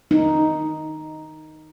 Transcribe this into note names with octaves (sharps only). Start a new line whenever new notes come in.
D#4